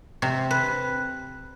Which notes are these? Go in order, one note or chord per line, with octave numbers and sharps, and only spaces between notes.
C3
B4